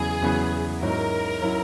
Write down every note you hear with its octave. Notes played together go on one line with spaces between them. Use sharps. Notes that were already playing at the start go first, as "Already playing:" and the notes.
Already playing: E2 C#3 F#3 B3 E4 G#4
E2 C#3 F#3 B3 E4
G#2 F#3 C#4 E4 A#4
F#3 C#4 E4